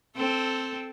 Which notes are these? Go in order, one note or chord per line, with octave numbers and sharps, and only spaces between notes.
C4 A4